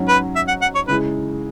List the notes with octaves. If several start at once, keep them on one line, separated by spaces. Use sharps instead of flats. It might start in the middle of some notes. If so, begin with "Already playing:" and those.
Already playing: G#2 F#3 C#4 F#4
B4
E5
F#5
F#5
C#5
C#3 G#3 E4 B4